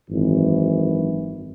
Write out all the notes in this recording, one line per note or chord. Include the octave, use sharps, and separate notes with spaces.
G#1 F#2 E3